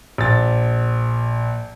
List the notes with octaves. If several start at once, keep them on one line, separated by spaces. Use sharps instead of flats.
A#1 A6